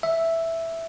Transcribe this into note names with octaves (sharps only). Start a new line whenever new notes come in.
E5